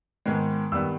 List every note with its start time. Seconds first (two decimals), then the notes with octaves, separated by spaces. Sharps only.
0.26 G#2 D#3 G#3 B3
0.72 G2 D#3 G3 B3 E6